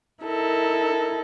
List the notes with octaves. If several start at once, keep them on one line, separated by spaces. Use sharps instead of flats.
D#4 E4 A4 A#4